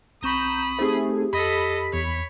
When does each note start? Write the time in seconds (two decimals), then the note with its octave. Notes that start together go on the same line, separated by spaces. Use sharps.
0.23 B1 C4 A#5 B5 C#6 D#6 G6 E7
0.79 A3 C4 D#4 G4 G#4 C5
1.33 F2 A4 D#5 B5 B6
1.93 E2 C#5